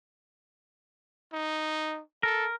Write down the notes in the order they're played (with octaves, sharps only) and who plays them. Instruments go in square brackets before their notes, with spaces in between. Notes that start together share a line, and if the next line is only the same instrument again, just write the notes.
[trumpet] D#4
[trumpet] A4 [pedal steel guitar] A#4